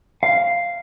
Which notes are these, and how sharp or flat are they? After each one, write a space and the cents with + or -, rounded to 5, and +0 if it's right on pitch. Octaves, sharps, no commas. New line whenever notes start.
F5 -5